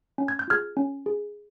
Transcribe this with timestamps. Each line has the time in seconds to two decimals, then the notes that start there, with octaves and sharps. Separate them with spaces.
0.18 C#4
0.28 G#6
0.39 G6
0.48 F4 G#4 F6 G#6
0.77 C#4
1.06 G#4